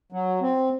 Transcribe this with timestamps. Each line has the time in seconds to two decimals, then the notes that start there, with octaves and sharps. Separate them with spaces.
0.12 F#3
0.42 C4